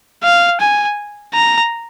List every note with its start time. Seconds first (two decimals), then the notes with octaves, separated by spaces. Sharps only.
0.24 F5
0.61 G#5
1.34 A#5